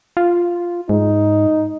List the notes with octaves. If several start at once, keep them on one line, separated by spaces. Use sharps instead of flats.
F4
G#2 D#4